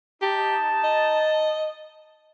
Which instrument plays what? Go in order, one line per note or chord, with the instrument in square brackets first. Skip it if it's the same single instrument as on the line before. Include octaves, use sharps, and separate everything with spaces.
[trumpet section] D#4 A5 [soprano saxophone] G4
[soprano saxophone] D#5